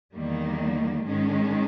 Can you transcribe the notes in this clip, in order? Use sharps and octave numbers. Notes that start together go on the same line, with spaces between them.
E2 D#3 G3 A#3
G#2 D#3 G#3 C#4